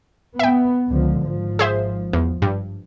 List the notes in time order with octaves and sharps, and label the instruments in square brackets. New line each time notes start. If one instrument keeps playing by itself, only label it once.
[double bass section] B3 [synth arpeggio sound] E5 G5
[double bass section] C#2 D3 F3
G#1 F3
[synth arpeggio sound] G#4 C5 E5
E2
G2